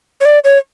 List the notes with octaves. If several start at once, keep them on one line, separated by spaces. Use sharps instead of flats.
C#5
D5
C#5